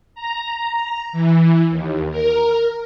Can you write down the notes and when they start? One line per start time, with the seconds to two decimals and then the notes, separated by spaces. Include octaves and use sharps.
0.15 A#5
1.12 E3
1.70 D#2
2.11 A#4